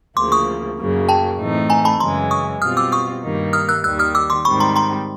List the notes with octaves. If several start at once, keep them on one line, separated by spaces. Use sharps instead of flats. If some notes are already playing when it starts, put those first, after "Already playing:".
D2 C#3 F3 A#3 C6 D6
C#6 D#6
F#2 C#3 F#3 A#3
G5 A5
A2 E3 A3 C4 D#4
G#5 A#5
A5 B5
F#2 C#3 E3 G#3 A#5 C6
C#6 D#6
B2 G3 C4 F4 D#6 F6
D6 E6
C#6 D#6
G2 D#3 G3 A#3 D#4
D#6 F6
E6 F#6
D#2 D#3 G3 E6 F#6
D#6 F6
D6 E6
C6 D6
G#2 D#3 G3 C4 B5 C#6
A#5 C6
A#5 C6